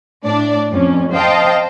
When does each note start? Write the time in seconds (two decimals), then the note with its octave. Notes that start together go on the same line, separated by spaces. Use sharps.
0.24 A2 D4 D5
0.72 F2 C#4
1.13 C5 D#5 F5 G5 A5